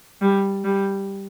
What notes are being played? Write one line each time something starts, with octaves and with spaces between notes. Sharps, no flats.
G3
G3